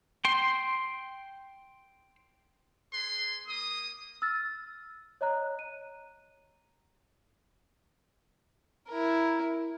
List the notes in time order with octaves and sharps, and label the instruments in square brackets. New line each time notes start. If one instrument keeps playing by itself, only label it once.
[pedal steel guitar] G5 C6
[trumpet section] G#4 B4 C6
A#3 D#6
[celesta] E6 F6 A6
C#5 D#5 A#5 F#6
D#7
[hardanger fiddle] E4 A#4